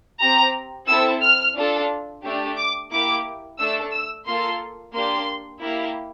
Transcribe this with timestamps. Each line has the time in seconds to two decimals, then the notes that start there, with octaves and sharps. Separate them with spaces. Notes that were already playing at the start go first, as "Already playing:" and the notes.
0.20 C4 G4 A#5
0.87 C4 E4 A4 E6
1.22 F6
1.55 D4 F4 A4
2.23 A3 D4 G4
2.57 D6
2.91 A#3 E4 G4 D6
3.58 A3 D4 A4 E6
3.92 E6
4.26 A#3 F4 A4 C6
4.93 A#3 D4 G4 C6
5.61 A#3 E4 G4